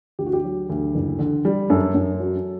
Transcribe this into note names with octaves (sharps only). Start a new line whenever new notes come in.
D2 G4
F#4
G4
F#3
D2
F#1
D3
G3
F#2 A4
F#2
F#3